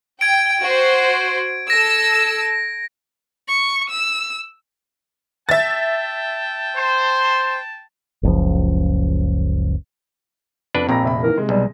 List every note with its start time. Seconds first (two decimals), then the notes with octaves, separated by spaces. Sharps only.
0.21 G5 G#6 D7
0.62 F#4 C5
1.70 A4 E6 A#6
3.48 C#6
3.90 E6
5.49 E5 G5 A5 A6
6.74 C5
8.23 F#1 C#2 F3
10.75 F2 D4 B4
10.89 A#1 F2 C4 A#5 B5 A#6
11.03 F1 E5 B5
11.23 D#3 E3 A#3 A#4
11.37 C3 G#3
11.49 B1 G3